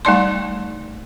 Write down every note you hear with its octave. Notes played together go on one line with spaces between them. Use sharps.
G3 A3 D#4 D5 A5 C6